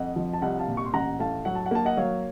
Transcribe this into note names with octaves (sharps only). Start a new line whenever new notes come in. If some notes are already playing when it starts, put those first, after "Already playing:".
Already playing: F2 D#5 F#5
F3
A5
C2 D#5 F#5
F5 A5
A#2
C#6
C6
A1 F#5 A#5
A2 F5 A5
F#3 F#5
A5
F#5
A#3 A5
D#5 F#5
F#3 C#5 F5